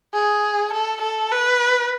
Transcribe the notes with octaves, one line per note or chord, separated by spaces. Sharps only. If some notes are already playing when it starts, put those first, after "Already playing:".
G#4
A4
A4
B4